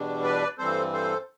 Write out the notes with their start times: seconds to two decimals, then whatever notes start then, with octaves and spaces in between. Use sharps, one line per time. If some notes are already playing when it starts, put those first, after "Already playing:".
Already playing: E2 B2 G3 D4
0.23 B4 D5
0.58 G2 E3 G3 C4 A4 C5
0.93 A4 C5